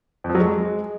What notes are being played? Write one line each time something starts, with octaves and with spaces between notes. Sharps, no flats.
F2
F3
F#3
G#3